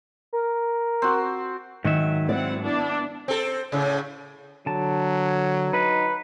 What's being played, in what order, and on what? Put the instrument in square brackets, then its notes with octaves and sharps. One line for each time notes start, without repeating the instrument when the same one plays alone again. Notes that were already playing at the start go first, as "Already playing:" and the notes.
[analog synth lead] A#4
[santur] C4 F#4
[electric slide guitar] G#2 F#3 E5 [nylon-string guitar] D#3
[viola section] C4 E4 F#5 [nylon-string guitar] D5
[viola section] B3 D4 E4
[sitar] C4 A4
A2 C#3
[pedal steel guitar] D3 A5 [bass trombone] F#3
[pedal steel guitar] D#4 [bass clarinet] B4